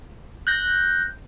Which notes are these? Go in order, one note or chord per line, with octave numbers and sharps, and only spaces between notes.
F#6 G6 A#6